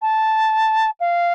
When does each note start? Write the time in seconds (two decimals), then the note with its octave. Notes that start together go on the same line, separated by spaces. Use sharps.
0.02 A5
1.00 F5